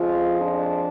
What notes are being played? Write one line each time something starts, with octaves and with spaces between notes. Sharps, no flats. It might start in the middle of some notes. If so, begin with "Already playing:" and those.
Already playing: F2 F3 G#3 F4
D4